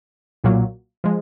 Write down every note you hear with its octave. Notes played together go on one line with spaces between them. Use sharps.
B1 A#2 F#3 A#3
F3 G#3